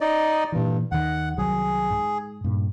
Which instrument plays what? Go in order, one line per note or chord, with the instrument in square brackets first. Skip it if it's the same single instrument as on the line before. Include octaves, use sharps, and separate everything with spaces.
[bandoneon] D#4 D5 D#5
[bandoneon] G2 [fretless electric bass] A#2 E3
[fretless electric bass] D#2 D#3 [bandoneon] F#5
[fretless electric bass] C2 D#3 F#3 [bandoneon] G#4
[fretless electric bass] G#2
G2 A#2